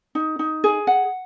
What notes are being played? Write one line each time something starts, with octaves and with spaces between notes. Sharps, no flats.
D#4
D#4
G#4
F#5